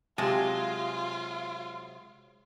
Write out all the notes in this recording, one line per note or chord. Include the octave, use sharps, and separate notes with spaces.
C3 F#3 G#3 F4 G4 A5